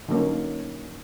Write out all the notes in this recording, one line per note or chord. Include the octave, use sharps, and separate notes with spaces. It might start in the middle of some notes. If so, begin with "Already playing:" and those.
D3 F#3 A#3 C#4 D#4